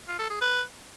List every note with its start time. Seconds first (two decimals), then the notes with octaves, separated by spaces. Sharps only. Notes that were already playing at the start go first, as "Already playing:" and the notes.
0.08 F4
0.19 A4
0.30 G#4
0.41 B4